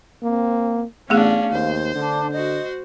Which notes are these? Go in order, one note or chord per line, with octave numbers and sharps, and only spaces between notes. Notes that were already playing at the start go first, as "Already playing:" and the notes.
A#3 C4
A1 A3 B3 C#4 D4 G#4 F5
D#2 C5
D3 D4
F#4 C5 D#5